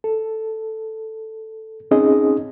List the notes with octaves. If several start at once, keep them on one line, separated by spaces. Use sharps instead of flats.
A4
C4 C#4 D#4 G#4 D#5